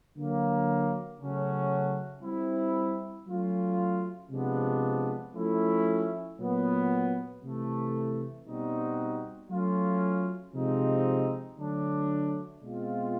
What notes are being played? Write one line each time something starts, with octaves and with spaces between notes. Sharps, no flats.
D3 F#3 A#3
C#3 F#3 A3 C#4 F#4
G3 C4 E4
F#3 A3 C#4 F4
C3 F3 G#3 B3 D4
F3 A3 C#4 E4
A#2 F#3 B3
C3 E3 A3
B2 G3 C4 D#4 F#4
F#3 A3 C#4 F4
C3 F3 G#3 C4 D#4
D3 F#3 A3 D4
B2 G#3 C4 F4